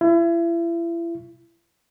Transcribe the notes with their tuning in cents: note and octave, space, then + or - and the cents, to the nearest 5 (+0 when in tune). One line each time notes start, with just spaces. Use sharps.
E4 +35